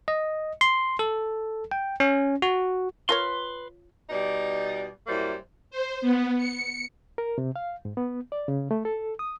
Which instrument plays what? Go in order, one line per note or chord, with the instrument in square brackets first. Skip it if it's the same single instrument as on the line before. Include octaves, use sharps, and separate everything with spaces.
[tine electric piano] D#5
C6
A4
G5
C#4
F#4
[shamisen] F4 A#4 C#5 [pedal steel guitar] B4 C6
[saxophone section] B2 G3 D#4 D5
F#2 G3 A#3 E4 C5
[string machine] C5
B3
C#7
[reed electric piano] A#4
C3
F5
G#2
B3
D5
C#3
A3
A4
D#6